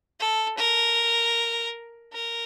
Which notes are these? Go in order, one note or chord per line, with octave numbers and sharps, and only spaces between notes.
A4
A#4
A#4